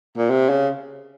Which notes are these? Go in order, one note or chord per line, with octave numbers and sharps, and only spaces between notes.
A#2
C3
C#3